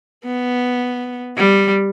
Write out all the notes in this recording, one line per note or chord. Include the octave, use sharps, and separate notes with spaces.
B3
G3